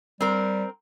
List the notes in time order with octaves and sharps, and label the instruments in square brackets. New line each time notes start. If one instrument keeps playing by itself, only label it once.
[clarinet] G3 [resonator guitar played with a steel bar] C4 A#4